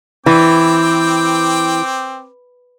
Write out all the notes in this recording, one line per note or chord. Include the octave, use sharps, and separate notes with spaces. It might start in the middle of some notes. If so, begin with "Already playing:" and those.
E3 C4 G5 D6